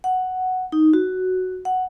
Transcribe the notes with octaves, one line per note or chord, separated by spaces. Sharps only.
F#5
D#4
F#4
F#5